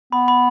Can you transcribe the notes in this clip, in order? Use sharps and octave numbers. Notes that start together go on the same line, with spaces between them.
B3 B5
B5